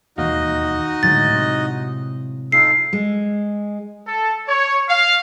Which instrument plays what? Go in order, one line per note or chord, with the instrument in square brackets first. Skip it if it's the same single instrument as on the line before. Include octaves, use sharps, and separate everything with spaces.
[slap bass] E1 D#2 A#3 [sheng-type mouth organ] D#4 F#4 D#5 [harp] F5
[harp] F#5
[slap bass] D1 D3 D#3 [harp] A2 F#3 G#3 [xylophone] A6
[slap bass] C3
[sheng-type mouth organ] D#4 F4 A4 [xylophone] C7
[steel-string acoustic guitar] G#3
[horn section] A4
C#5
F5